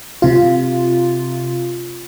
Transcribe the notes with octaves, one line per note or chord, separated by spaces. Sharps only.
C3 F4